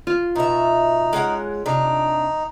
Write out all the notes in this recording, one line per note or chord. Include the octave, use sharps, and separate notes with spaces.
F4
B2 D#4 E5
G#3 C#4 F#5
C3 D4 D#4